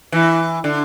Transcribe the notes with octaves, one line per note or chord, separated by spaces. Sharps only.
E3 E4
D3